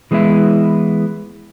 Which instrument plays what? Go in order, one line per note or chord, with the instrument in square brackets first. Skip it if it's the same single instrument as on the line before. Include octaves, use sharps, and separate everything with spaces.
[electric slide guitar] E3 G#3 B3 D4 E4